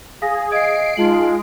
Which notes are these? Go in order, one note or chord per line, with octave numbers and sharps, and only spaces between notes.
G#4 F5 D#6 A#6
D#5 F5 D#6 G#6 C7 D7
G#3 D#4 F4 A5 F#7